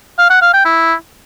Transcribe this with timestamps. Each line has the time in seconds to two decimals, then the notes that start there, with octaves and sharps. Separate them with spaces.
0.19 F5
0.30 F#5
0.42 F5
0.53 G5
0.65 E4